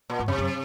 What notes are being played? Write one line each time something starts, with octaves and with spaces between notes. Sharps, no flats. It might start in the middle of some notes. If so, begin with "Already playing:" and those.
A#2
G#2
F#2 C3
F#2